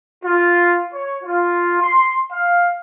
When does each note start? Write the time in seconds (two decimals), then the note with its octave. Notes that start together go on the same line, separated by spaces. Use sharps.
0.25 F4
0.94 C#5
1.23 F4
1.82 C6
2.32 F5